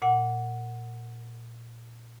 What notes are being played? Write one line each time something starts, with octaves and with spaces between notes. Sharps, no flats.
A#2 F#5